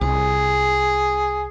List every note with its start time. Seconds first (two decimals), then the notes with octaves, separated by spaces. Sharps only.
0.01 C2 G#4